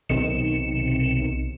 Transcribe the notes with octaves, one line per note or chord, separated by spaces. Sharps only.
B1 C3 D#3 C#7 E7